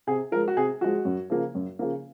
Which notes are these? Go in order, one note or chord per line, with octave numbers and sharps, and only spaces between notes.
C3 G#4
F3 G#3 A#4
F#4
C3 G#4
F3 G#3 F#4
F#2
C#3 F3 A#3
F#2
C#3 F3 A#3